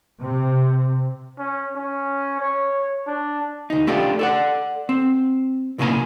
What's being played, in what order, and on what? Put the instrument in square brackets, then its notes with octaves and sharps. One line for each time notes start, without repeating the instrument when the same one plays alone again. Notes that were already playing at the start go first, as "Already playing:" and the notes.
[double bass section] C3
[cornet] C#4
C#4
C#5
D4
[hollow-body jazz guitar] D2 D#4
A3 C#4 D4 F4 G4
A4 D5 F#5
C4
B1 A2 C#3 A#3 G#5 A#5